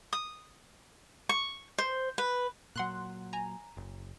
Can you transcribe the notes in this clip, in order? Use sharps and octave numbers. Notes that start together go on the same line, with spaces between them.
D#6
C#6
C5
B4
A#2 F#3 F#5 C6 F#6
G#5 A#5
F#1